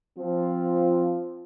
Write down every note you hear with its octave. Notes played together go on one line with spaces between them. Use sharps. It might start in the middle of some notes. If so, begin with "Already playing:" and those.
F3 C4 F4